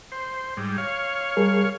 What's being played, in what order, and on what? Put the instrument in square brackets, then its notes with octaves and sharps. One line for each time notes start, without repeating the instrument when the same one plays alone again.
[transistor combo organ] C5
G#2 G3
C#5 F5
[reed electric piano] G3 G#4 A#4